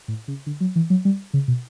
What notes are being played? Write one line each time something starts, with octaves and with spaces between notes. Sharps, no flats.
A2
C#3
D3
F#3
E3
F#3
G3
C#3
B2